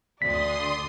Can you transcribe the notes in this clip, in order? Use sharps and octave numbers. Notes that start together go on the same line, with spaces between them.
D2 D3 D5 C6 D#6 B6